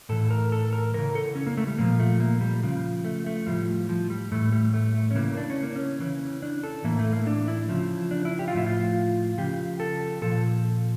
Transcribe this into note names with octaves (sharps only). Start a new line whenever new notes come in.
A2 E3 A4
A#4
A4
A#4
C#3 E3 A#4
A4
C#4
A#3
A3
G3
A#2 F3 A#3
A3
A#3
G3
C#3 F3
A3
A3
A2 F3 G3
F3
G3
A2 E3 A3
G3
A3
A3
C#4
C#3 E3 A#3
D4
C#4
A#3
C#4
C#3 E3
D4
A4
A2 E3 A#3
A3
A#3
D4
E4
C#3 F3
D4
E4
G4
F4
A2 F3 E4
F4
C#3 F3 G4
A4
A#2 F3 A4